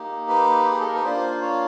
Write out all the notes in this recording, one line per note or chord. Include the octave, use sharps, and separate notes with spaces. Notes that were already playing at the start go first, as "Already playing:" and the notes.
Already playing: A#3 D#4 G4
B4
G#4
A4
A#4
B4
A#3 D4 F4 C5
C#5